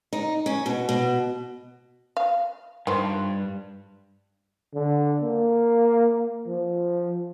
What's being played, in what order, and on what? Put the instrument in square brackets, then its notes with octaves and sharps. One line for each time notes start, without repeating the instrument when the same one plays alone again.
[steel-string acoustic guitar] D#4
C#4
B2
B2
[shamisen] F5
[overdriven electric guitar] G2 [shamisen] D#3 F3 C5
[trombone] D3
A#3
F3